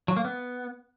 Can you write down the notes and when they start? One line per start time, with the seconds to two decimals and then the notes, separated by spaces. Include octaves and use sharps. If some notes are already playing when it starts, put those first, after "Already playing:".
0.08 F#3
0.16 A#3
0.25 B3